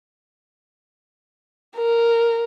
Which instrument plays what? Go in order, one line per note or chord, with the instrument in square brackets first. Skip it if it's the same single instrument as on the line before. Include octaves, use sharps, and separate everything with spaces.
[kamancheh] A#4